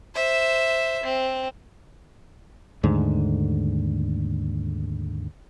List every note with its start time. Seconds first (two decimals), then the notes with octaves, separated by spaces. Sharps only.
0.15 C5 E5
1.04 C4
2.83 D#2 G#2 D3 A3